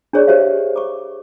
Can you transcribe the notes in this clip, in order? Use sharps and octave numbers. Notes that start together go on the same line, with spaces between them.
D4 G#4 C#5 D5 C#6
G4 C5 C#5 E5 F5
C#6 D6